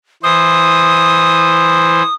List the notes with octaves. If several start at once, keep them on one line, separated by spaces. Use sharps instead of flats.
E3 C5 D#6